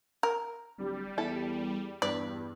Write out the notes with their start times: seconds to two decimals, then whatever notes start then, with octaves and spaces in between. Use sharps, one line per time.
0.23 A#4
0.78 D1 G3
1.18 E2 E4 A4
2.02 E2 G2 B4 D5